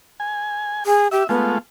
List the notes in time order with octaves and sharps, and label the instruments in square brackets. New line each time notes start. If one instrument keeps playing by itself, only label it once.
[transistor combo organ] G#5
[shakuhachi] G#4
[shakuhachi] G4 [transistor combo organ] E5
[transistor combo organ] G#3 A3 F4 [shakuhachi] B3